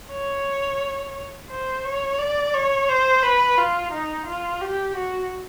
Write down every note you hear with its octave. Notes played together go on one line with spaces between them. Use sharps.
C#5
C5
C#5
D5
C#5
C5
B4
F4
D#4
F4
G4
F#4